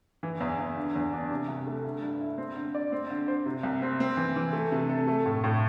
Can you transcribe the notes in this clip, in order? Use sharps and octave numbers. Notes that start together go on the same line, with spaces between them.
E3
E2
E2
D3
E2
D4
C3
C2
A3
D3
G2
E4
C4
D3
D5
C4
D3
C5
C3
C2
C4
C4
E3
E3
A3
C3
A4
A3
A2
A2